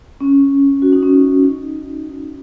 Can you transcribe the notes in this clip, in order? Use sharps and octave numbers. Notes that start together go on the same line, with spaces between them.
C#4
F#4
D#4
C#4
D#4
D#4
D#4